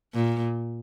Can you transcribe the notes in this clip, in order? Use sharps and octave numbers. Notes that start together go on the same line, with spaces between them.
A#2